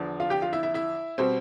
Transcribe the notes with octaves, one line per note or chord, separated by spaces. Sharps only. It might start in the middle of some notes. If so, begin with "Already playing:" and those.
Already playing: E2 D3 F3
F4 F5
G4 G5
F4 F5
E4 E5
E4 E5
E4 E5
B2 G3 C4 C5